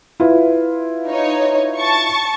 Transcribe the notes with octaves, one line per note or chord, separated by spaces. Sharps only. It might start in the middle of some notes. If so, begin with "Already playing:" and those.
E4 F4 B4
D#4 C#5
A5 C#6